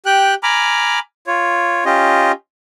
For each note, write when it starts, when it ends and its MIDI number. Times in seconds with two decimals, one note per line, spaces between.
0.06 0.34 67
0.06 0.34 79
0.06 0.34 90
0.43 0.99 80
0.43 0.99 82
0.43 0.99 83
0.43 0.99 86
0.43 0.99 89
1.27 1.85 65
1.27 1.85 73
1.85 2.32 61
1.85 2.32 65
1.85 2.32 67
1.85 2.32 75